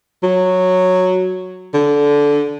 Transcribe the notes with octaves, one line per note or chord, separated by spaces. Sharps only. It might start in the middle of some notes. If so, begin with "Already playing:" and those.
F#3
D3